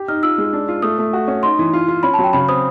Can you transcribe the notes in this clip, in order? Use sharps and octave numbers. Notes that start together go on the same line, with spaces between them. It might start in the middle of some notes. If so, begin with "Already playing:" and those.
Already playing: G4
D#4 F6
F4 E6
G#3
D4
F4
A3 D#6
A3
F#4
C#4
D#4 C6
E3
F4
F4
C#4 B5
A5
F#3
G5
C#3 B5
C4 D#6